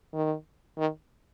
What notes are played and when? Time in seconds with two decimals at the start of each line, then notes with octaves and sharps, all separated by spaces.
0.14 D#3
0.78 D#3